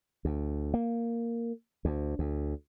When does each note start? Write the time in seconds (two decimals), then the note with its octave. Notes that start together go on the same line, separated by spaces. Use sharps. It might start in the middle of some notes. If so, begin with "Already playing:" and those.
0.25 D2
0.74 A#3
1.85 D2
2.19 D2